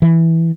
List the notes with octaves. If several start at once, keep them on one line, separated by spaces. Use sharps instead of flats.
E3